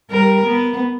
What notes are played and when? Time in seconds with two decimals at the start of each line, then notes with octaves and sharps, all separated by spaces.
0.10 G3 A#4
0.46 B3